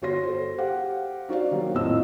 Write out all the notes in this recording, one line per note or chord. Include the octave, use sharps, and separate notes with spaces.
G1 F#4 C#5 C6 A#6
A4 C5
G4 C5 F5 F#5
D#4 F#4 C5 D5 F5
D#3 F#3 A#3 F#4
A#1 F2 A2 D#5 E6